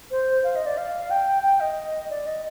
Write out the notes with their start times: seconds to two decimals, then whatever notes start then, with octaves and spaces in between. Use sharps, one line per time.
0.11 C5
0.44 F5
0.56 D#5
0.66 D5
0.77 F5
1.11 G5
1.43 G5
1.60 D#5
2.10 D5
2.27 D#5